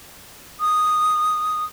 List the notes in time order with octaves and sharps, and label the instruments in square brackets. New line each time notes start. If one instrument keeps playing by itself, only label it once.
[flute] D#6